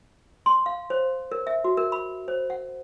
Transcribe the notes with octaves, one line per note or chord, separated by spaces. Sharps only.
C6
F5
C5
A#4
E5
F#4
A#4
B5
C5
F#5